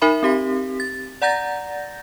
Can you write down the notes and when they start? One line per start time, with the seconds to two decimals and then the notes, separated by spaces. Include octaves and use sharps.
0.02 D#4 A#4 E5 B5
0.23 C4 G4 B6
0.80 A6
1.22 D5 F#5 A#5 G6 A6 A#6